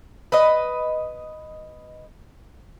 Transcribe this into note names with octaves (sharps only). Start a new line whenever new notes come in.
B4 D#5